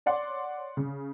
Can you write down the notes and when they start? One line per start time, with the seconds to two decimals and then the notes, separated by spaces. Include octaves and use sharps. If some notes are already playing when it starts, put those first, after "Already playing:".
0.06 C#5 D5 F#5 C6 D6
0.77 C#3